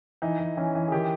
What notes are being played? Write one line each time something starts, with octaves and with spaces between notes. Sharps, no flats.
E3 D#4
E3
E3 C#4
E3
G#4
D#3 G4